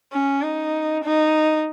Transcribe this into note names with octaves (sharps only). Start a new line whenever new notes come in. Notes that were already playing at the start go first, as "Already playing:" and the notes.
C#4
D#4
D#4